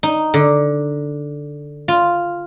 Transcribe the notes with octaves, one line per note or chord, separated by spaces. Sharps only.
D#4
D3
F4